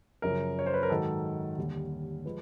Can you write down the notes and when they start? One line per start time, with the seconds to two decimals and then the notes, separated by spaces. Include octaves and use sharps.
0.22 F#2 C#3 F3 A#4
0.59 C#5
0.66 C5
0.74 B4
0.83 A#4
0.90 G#2 D#3 F#3 A4
1.58 D#2 D3 G3
2.24 F3 G#3 B4